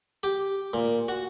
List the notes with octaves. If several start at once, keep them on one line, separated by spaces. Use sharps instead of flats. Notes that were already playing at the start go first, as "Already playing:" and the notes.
G4
A#2
F#4